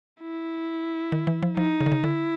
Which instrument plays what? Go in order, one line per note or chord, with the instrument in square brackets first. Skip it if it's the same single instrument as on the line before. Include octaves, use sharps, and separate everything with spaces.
[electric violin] E4
[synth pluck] D#3
E3
F3
[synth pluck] F3 [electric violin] D#4
[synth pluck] C#3
D3
C#3
[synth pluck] D3 [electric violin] E4